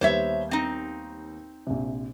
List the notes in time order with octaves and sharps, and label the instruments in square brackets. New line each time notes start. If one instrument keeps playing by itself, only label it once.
[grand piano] D#2 G3 B3 [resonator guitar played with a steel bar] C5 C#5 E5
[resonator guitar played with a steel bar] C4 D#4
[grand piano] A#1 C3